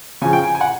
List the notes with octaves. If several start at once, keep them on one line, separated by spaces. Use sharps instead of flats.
C#3 F3 G#5
G5
G#5
G#5
F#5